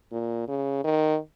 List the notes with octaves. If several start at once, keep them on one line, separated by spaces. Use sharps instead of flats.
A#2
C#3
D#3